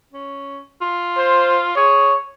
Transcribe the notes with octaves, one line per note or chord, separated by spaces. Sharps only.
C#4
F4
C5
G#4 C#5